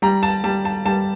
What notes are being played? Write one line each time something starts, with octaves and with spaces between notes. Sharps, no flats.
G3 A#5
A5
G3 A5
A5
G3 A5